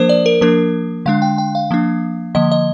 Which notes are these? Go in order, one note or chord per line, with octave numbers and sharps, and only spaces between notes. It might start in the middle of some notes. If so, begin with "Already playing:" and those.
Already playing: F3 A#3 D4 A#4 C5
D5
A#4
F3 A#3 D4 A#4
D3 G#3 D4 F5
G5
G5
F5
F3 A#3 D4
D3 F3 A#3 D#5
D#5